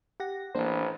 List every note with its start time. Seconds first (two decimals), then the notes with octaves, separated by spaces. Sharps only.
0.20 G4 F#5 A#6
0.55 A1 E3 A#3 D4 C5